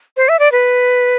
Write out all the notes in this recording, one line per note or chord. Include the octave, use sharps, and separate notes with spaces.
C5
E5
D5
B4